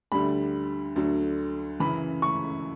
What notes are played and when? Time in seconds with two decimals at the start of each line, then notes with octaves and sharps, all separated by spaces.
0.12 D2 D3 G3 B5
0.96 D2 D3 F#3
1.80 F#2 C#3 E3 B5
2.22 C#6